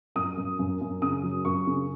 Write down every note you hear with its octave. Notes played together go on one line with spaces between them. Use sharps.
F#2 D#6
F#2
F#2
F#2
C#3 D#6
F#3
F#2 C#6
C#3